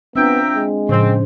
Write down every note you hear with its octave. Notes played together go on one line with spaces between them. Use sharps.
B3 C4 D4 F4 E5 G5 A#5
G#3
A2 C#3 F3 C4 C5